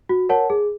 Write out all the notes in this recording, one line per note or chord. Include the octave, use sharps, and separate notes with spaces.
F#4
A#4 C#5 F#5 A5
G#4